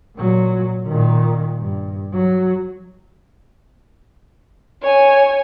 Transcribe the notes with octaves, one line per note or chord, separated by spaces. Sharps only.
A#2 F#3
A#2 D#3
G2
F#3
C#5 G#5